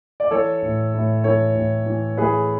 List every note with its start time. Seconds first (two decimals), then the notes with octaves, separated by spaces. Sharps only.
0.20 D5
0.31 E3 A4 C#5
0.62 A2
0.94 A2
1.24 E3 A4 C#5
1.55 A2
1.86 E3
2.17 E3 G#4 B4